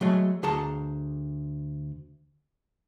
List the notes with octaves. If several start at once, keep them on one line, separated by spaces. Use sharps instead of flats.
F#3 G#3 A3
D2 G#4 A5 A#5